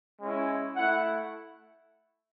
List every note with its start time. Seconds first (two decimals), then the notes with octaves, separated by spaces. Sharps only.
0.20 G#3 C#4 E4
0.76 A3 E4 F#5